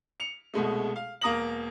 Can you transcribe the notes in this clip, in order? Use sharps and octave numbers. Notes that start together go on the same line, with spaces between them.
C#7 F7
C2 B2 G#3 A3
F5
E1 A#3 A#5 D#6 A#6 F#7